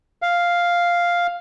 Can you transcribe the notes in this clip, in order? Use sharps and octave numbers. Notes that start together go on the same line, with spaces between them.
F5